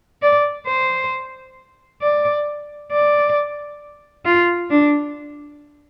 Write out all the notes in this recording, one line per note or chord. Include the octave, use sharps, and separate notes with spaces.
D5
C5
D5
D5
F4
D4